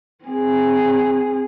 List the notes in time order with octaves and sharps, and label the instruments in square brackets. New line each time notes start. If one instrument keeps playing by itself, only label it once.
[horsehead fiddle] C4 G#4